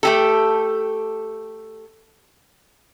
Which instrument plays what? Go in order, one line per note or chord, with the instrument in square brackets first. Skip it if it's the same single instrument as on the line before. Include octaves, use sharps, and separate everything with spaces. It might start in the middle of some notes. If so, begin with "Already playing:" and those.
[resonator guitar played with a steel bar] A3 G4 A4